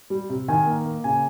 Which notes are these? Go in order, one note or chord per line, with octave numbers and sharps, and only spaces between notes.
G3
C3
D#3 G#5
A#3
A#3
C#3 G#5